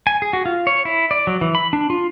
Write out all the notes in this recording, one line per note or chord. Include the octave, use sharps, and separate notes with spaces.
G#5
G#4
F#4
F4
C#5
E4
D5
F#3
E3
B5
D4
F4